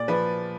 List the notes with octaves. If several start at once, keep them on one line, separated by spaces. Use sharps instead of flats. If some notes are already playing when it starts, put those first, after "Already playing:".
Already playing: A#2 D5
F3 B4